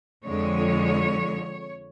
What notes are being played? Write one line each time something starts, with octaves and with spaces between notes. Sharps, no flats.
F2 D3 G#3 C#5